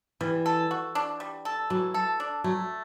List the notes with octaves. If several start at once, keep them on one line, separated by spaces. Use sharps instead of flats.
E3 G3
A4
F#4
D4
G3
A4
E3 F#3
A4
D4
F#3 A3